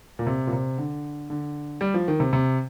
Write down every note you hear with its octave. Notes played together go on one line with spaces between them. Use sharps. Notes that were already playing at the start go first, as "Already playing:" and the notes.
A#2
C3
A#2
C3
D3
D3
G3
F3
D#3
C3
C3